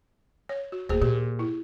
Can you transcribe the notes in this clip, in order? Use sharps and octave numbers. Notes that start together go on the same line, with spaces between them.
C#5
F#4
D1 A#3 G#4 C5
A#2 G4
E4